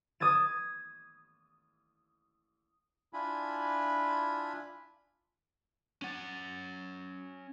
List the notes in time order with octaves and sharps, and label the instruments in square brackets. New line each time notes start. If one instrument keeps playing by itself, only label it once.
[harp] D#6 G#6 A6 E7
[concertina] D4 E4 F4 G#5 B5
[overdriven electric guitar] C#4 F#5